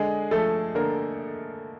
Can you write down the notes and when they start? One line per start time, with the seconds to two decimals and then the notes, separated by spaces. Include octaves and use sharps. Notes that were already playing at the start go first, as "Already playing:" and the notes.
Already playing: D3 G#3 G#4
0.31 F3 A3 A4
0.75 D3 A#3 A#4